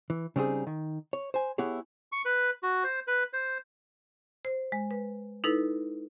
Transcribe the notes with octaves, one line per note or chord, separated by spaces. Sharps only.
E3
C#3 G3 C4 D#4 F#4 G#4
D#3
C#5
C5 G#5
B3 E4 G4 G#4 C#5
C#6
B4
F#4
C5
B4
C5
C5
G#3
B4
D#4 E4 A4 B4